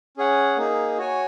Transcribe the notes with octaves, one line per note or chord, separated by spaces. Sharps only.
C#4 G#4 C#5 F#5
A#3 D#4 G#4
F#4 C#5 G#5